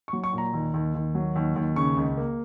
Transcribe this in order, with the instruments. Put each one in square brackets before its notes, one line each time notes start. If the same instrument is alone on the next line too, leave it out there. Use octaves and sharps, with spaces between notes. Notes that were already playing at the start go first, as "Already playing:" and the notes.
[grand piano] C#6
F#3
C#6
A#2 A#5
D#2
D#2
D#2
F#3
D#2
D#2
C#3 C#6
C#2
A#3